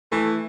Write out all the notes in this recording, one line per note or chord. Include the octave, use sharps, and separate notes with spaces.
E3 A3